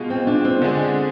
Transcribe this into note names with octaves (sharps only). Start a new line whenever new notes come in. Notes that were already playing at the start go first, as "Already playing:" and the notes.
Already playing: B2 G#3 F4
C4
D4
C4
D3 G#3 D4 G#4